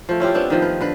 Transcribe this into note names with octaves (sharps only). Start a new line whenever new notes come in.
F3 A3
C#4 E4 F4 G4
B3 C4 D4
D#3 F3
B4
D3 B4